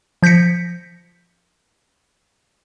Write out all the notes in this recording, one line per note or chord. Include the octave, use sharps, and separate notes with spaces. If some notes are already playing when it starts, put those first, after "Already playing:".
F3 G6 A#6 B6 C#7